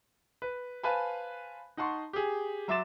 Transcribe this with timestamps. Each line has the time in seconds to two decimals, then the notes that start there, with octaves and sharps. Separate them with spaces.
0.42 B4
0.83 B4 C5 F5 G#5 A5 B5
1.77 D#4 F#5 A5 C6 C#6
2.13 G4 G#4
2.68 F#3 E5 C6 D6 A6 E7